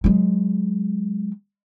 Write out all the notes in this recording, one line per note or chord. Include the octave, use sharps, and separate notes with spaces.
F#3 G#3